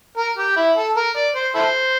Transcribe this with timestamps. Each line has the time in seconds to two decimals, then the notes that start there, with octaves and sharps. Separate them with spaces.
0.17 A#4
0.37 G4
0.56 E4
0.77 A4
0.97 A#4
1.16 D5
1.35 C5
1.55 E4 A4 C5